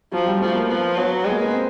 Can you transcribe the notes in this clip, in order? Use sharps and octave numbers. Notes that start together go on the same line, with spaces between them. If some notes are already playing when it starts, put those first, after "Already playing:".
F3 F#3
G3
F3 A3
A#3
F3 B3
F#3 B3
G#3
A#3
B3
C4